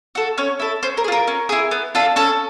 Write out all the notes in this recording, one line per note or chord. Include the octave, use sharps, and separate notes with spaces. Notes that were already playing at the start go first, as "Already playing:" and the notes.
F#4 A4
C#4 C#5
E4 A4
C#4 C5
A#4
G#4
F4 A#4
C#4
E4 G#4
B3
D4 F4 A4
C#4 A4